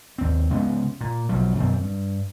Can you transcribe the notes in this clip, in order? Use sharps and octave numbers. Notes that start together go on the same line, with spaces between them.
D#2 C4
C#3 G#3 B3
A#2
B1 F3 F#3
F#2 B2 D#3 C4
G2